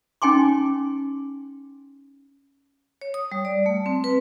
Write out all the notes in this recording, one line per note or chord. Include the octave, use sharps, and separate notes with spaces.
C#4 D#4 G5 G#5 C6 D6
C#5
D#6
G3
D5
A3
C4
B4